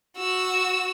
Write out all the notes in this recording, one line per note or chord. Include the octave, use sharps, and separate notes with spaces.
F#4 E6